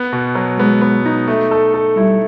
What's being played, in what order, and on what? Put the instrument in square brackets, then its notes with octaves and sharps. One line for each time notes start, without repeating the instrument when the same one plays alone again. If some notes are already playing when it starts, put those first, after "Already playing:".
Already playing: [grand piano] B3
B2
F#3
[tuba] G#3 [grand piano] B3
[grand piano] B3
D#4
A3
A4
A4
[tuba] G3 [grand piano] E4